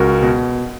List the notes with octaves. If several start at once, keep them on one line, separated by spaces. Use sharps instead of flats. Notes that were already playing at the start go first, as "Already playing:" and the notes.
Already playing: C#2 F#4 A#4
B2